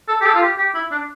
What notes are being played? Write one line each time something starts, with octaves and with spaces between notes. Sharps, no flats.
A4
G4
A4
F4
G4
G4
E4
D4